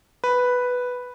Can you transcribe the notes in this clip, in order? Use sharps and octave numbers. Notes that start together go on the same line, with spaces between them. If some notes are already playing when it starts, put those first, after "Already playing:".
B4